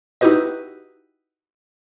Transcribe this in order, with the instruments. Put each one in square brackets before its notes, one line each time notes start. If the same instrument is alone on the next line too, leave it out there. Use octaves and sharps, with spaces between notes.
[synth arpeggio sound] D#4 E4 F#4 G4 B4 D#5